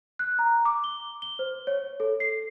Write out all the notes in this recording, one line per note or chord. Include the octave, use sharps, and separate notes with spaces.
F#6
A#5
D6
G7
G7
C5
C#5
A4
C7